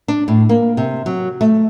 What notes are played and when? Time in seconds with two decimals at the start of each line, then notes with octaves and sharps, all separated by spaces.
0.08 D4
0.28 A2
0.49 A#3
0.77 C3
1.06 F#3
1.41 A3